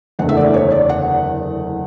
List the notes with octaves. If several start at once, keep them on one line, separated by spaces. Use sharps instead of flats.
F#1 E2 D3 A3 F#5
E5
D5
C#5
D5
F#5